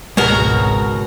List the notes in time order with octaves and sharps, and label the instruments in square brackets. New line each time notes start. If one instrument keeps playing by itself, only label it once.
[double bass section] G#1 C#2 [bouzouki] B2 F#4 A#4 [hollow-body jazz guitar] G#3 A5